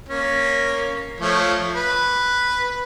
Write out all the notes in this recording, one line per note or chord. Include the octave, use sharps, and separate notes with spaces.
A#3 C#4
F3 A3 C#5
B4